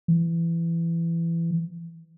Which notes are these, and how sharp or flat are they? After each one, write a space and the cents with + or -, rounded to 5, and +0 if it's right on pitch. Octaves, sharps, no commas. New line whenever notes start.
E3 +20